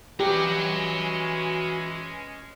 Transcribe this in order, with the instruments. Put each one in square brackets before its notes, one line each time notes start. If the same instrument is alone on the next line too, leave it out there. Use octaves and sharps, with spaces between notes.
[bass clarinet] E3 [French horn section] G#3 C#4 [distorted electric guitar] F#4 A#5 [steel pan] G4